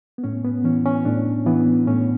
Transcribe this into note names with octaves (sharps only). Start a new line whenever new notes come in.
B3
A2 C#4
B3
E3 C#4
C#4
A2 D4
E3 B3
A2 C#4